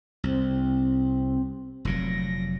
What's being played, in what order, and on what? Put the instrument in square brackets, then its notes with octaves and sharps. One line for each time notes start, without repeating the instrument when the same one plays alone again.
[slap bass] C2 [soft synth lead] C4
[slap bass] F1 A#2 F#3 [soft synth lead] A#6